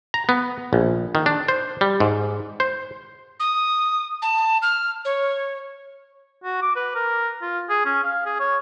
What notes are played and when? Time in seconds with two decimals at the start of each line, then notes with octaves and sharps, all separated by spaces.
0.14 A#5
0.29 B3
0.73 A#1
1.15 D#3
1.26 D4
1.48 C5
1.81 G3
2.00 G#2
2.60 C5
3.40 D#6
4.22 A5
4.62 F6
5.05 C#5
6.44 F#4
6.62 D6
6.76 B4
6.95 A#4
7.42 F4
7.70 G#4
7.85 C#4
8.03 F5
8.26 G#4
8.40 C#5